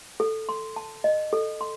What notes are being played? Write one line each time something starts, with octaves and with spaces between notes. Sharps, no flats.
A4
C6
A5
D#5
A4
C6